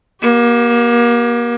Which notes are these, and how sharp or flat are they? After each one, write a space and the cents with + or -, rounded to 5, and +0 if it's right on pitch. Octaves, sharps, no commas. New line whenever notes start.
A#3 +30 G4 -25